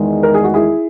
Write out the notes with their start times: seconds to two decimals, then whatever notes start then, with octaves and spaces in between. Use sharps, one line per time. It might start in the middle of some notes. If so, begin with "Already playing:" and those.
Already playing: E2 D#3 G#3
0.23 A#4
0.34 G#4
0.44 F#4
0.54 E4 G#4